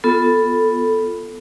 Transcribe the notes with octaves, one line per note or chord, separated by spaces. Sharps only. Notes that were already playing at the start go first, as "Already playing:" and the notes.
B3 F4 A4